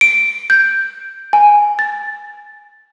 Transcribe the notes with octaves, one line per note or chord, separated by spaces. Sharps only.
D7
G6
G#5
A6